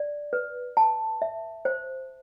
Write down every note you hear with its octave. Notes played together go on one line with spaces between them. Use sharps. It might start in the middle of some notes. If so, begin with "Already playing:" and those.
Already playing: D5
B4
A5
E5
C5